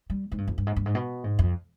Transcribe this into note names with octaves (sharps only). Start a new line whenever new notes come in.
G3
G#2
G2
F2
G2
G#2
G2
G#2
B2
G#2
F2